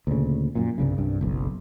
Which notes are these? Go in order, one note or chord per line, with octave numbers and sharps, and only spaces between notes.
D2 A#2 C#3
F#2 A#2
C2 G2 C#3
C2 G2
F#1 B1